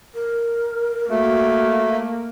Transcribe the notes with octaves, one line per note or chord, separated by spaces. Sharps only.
A#4
A3 A#3 F#4